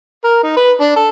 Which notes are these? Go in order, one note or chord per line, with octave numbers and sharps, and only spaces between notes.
A#4
D#4
B4
D4
A4